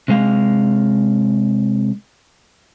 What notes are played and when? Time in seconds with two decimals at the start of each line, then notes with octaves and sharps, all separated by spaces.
0.08 C3 G#3 F5